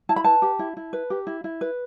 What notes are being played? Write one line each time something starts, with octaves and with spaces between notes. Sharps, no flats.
E4 A5
B5
B4 A5
G4
E4
E4
B4
G4
E4
E4
B4